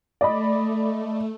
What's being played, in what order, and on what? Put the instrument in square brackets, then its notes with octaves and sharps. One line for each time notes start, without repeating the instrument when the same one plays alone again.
[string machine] A3 [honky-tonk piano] D5 D#5 B5